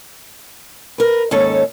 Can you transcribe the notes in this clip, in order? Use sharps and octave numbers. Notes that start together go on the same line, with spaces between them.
A#4 B4
D#2 G#2 C#4 A4 C#5